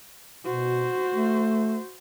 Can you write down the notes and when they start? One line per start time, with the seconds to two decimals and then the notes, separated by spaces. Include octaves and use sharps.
0.45 B2 F#4 C5
1.14 A3